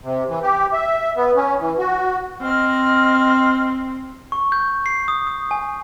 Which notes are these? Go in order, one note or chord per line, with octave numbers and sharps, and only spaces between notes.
C3
E3
G4
E5
B3
C#4
E3
F#4
C4 D#5 F6
C#6
G6
C7
D#6
D#6
G#5